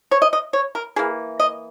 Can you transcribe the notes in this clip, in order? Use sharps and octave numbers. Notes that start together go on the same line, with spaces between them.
C#5
D#5
D#5
C#5
A#4
E3 A#3 G#4
D#5